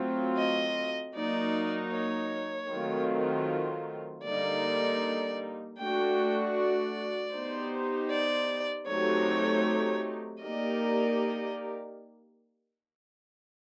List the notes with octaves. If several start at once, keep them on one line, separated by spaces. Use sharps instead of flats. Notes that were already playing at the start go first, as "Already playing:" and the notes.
Already playing: F#3 A3 C4 F4
D#5
F#3 A#3 D#4 D5
C#5
D#3 F#3 A3 C4 F4
D3 G3 A#3 D#4 D5
A3 D4 F#4 G5
D5
B3 D#4 G4 C5
D5
F#3 A3 C4 D#4 G4 C#5
A#3 D#4 G4 A#4 D5 D#5